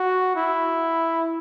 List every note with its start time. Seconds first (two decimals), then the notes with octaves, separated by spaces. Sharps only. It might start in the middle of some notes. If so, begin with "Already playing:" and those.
Already playing: F#4
0.36 E4